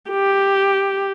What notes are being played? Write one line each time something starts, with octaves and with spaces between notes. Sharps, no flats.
G4